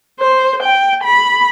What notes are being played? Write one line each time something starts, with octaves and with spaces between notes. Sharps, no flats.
C5
G5
B5